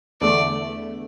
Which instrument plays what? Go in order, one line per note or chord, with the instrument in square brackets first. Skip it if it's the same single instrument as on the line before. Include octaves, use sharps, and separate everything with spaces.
[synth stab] E2 D3 A3 [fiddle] D5